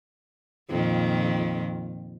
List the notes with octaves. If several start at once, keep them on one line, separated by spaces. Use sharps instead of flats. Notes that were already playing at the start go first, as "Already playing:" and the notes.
F2 A#2 D#3